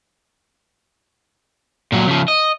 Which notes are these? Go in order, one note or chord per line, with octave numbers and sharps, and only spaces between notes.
A#2 F#3
C#3 F3
D#5